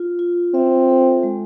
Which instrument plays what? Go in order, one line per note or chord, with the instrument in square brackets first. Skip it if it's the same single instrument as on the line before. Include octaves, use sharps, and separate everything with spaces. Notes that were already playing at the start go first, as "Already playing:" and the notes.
Already playing: [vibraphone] F4
F4
[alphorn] C4 [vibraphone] E5
[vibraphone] A4
G#3